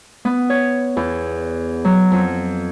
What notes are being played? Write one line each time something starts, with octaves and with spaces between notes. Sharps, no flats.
B3
C#5
E2
F#3
F2